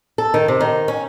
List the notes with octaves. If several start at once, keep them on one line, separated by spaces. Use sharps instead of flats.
A4
D#3
C3
D#3
C#4